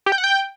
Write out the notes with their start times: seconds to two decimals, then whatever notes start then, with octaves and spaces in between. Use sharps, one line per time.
0.06 G4
0.12 G5
0.18 F#5
0.24 G5